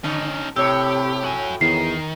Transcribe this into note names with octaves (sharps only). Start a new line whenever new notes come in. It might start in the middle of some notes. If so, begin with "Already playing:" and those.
D3 C#4 D#4
A2 C3 G4 C#5 E6
F#4 G#5
E2 D#3 C7